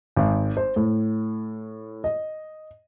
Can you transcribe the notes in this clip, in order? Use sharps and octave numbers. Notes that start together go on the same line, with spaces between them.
G#1
C5
A2
D#5